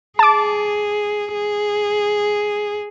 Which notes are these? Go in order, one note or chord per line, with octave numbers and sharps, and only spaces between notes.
G#4 A5 D6
G#4